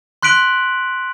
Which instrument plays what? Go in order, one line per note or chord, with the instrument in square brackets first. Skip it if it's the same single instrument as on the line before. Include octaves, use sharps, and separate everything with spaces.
[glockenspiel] C6 F#6 B6 D7 F#7